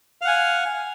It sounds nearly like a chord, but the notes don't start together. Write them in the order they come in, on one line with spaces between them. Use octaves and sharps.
F5 F#5 G#5